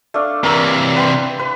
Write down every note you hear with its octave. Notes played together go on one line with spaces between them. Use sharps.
A3 D4 F5
C3 E3 A#4
B4 G5 C6
B4